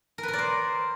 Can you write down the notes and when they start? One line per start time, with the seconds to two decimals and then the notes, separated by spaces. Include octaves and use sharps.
0.18 A#4
0.23 B4
0.28 A#4
0.33 D5
0.38 C5